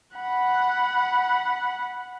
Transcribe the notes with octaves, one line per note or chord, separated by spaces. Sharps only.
F#5 B5